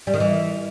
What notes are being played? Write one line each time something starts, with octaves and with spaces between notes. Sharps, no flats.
G3
D#3
E3